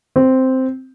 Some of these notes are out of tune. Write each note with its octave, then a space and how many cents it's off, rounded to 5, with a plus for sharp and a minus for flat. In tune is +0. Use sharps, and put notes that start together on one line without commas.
C4 -5